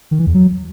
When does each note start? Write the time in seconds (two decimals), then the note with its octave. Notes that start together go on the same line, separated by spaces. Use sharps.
0.11 D#3
0.19 E3
0.27 E2
0.34 F#3